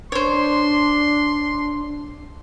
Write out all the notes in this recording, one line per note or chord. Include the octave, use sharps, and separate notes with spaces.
D4 C5 C#5 C6